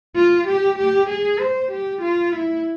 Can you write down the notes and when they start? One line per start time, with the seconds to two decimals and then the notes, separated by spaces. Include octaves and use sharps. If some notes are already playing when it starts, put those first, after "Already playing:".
0.16 F4
0.47 G4
0.78 G4
1.09 G#4
1.40 C5
1.71 G4
2.02 F4
2.33 E4